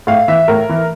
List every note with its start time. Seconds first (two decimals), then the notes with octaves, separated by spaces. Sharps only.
0.07 A2 F5
0.28 E3 E5
0.48 A2 A#4
0.69 E3